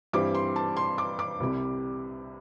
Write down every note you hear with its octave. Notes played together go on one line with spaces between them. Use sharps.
G2 E3 G3 C4 D6
C6
A5
C6
D6
D6
C2 C3 G3